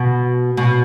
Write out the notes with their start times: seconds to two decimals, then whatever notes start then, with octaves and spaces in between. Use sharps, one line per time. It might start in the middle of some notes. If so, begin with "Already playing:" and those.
Already playing: B2
0.57 B2